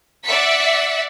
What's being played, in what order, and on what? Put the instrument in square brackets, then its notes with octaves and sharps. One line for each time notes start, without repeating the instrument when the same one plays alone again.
[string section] D5 E5 F#5 B6 C#7